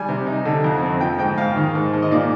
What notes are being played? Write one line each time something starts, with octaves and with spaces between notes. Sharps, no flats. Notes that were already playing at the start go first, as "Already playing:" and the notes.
Already playing: G3 G#5
C3
D#4
D3
F2
C4
F3 G5
G#2 G5
G#2 F5
D#3
G#2
G#2
D#5
A#2 D5